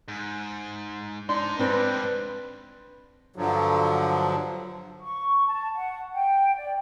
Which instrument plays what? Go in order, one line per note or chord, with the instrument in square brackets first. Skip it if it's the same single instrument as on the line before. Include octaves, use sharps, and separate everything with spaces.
[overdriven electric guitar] G#2
[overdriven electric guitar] G#2 D#4 [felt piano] D4 [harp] C6
[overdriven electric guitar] G#2 G3 [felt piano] C4 D4 [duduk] B4 [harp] A#6
[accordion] G2 D3 F3 F#3
[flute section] C#6
A5
F#5
G5
D5